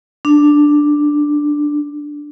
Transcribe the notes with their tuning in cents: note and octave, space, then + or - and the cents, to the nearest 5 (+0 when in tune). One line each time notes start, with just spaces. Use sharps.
D4 +5